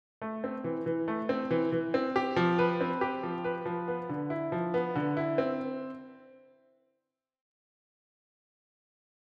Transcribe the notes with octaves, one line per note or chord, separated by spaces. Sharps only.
A3
C4
E3
E3
A3
C4
E3
E3
C4
G4
F3
B4
C4
G4
F3
B4
F3
B3
D3
E4
F3
B3
D3
E4
C4